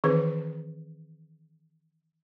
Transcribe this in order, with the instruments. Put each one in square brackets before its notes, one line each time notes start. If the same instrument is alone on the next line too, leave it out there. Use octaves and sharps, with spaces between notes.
[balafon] D#3 E3 C4 G#4 B4